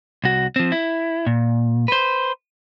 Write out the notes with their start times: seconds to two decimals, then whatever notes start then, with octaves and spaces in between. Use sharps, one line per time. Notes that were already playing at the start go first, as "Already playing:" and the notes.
0.24 C2 F#4
0.56 F3 C4
0.72 E4
1.27 A#2
1.88 B4 C5